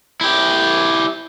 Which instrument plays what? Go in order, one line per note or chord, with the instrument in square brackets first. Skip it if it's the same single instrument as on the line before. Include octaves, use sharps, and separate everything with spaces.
[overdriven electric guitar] E4 G4